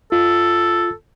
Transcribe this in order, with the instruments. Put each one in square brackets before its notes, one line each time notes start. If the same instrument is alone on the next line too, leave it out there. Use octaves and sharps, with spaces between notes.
[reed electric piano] F4 [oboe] A4